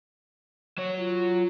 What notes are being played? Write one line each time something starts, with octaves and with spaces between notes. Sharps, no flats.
F#3 C#5
F4